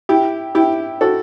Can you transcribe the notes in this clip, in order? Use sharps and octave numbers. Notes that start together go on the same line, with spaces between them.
E4 G4
E4 G4
F#4 A4